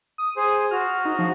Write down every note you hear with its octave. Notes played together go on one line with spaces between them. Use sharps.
D#6
G#4 C5
F#4 F6
D#4
F3